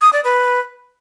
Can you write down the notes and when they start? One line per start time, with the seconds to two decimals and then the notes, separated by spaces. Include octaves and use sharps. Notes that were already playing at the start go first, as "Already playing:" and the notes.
0.01 D#6
0.13 D5
0.24 B4